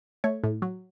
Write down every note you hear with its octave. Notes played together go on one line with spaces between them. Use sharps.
A3 C#5
A2
F#3